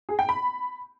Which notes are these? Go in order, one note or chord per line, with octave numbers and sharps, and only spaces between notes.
G#4
G5
B5